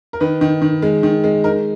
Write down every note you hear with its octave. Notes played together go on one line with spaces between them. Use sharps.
A#4
D#3 B4
D#3
D#3
G#3
D#3
G#3
D#4 A#4